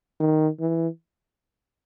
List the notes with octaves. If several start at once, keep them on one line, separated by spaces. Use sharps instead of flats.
D#3
E3